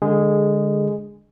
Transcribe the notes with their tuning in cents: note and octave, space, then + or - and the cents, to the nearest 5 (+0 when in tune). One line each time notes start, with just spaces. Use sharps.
D3 +0 G#3 -15 G#4 -5